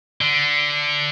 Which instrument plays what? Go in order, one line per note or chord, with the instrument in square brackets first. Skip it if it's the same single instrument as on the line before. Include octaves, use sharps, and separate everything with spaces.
[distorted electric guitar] D3